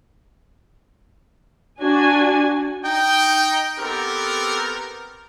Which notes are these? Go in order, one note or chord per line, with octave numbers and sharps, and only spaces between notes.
D4 F#4 G#5
D#4 G5
B3 C4 G4 A4 A#4